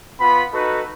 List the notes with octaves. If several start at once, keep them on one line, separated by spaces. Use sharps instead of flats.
B3 F4 B5
D#4 F#4 A4 B4